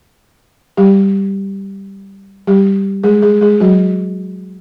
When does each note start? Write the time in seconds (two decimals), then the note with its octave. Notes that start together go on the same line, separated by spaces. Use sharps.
0.77 G3 G4
2.47 G3 G4
3.04 G#3 G#4
3.22 G#3 G#4
3.41 G#3 G#4
3.60 F#3 F#4